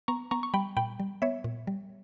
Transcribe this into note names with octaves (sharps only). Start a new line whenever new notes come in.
B3 A#5 C#6
B3 A#5 C#6
C#6
G3 G5 B5
A#2 G5 B5
G3
B3 C#5 E5
A#2
G3